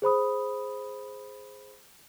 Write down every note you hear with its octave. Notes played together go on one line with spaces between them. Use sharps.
G#4 C5 B5 D#6